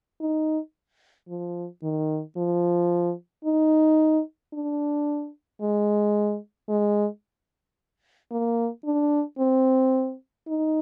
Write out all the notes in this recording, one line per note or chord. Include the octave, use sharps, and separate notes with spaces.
D#4
F3
D#3
F3
D#4
D4
G#3
G#3
A#3
D4
C4
D#4